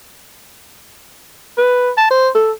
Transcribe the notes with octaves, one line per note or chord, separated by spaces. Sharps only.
B4
A5
C5
A4